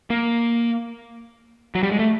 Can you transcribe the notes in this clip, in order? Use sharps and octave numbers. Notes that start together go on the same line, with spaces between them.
A#3
F#3
G3
G#3
A3